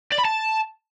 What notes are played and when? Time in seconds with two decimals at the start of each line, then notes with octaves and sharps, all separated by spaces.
0.12 D5
0.19 B5
0.25 A5